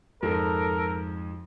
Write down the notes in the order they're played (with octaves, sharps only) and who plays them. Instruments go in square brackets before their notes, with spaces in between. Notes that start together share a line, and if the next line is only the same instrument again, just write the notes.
[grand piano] F2 G#2 F3 [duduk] A4 [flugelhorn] A#4